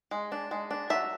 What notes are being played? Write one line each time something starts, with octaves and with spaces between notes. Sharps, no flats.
G#3
D4
G#3
D4
F#3 E5